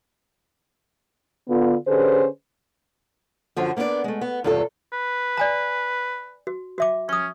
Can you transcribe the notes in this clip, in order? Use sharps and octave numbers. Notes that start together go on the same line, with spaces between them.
D3 B3 F4
D3 C#4 G4 G#4 B4 C5
F#2 D3 F3 F#4
A#3 B3 D4 E4 D5
G#3 A3
B3
E2 G2 C3 F4 A4 C#5
B4
D5 G#5 A#5
F#4
F#4 E5 D6
C#4 C#6 D#6